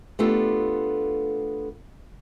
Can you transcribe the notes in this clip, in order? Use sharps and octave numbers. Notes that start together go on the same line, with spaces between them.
A3 B3 D4 F4 G4 A4